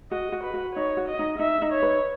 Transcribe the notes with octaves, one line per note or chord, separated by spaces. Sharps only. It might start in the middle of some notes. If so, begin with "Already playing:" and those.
F#4 D#5
F#4
B4
F#4
D#4 C#5
F#4
D#5
D#4
D#4 E5
D#4
C#5
B4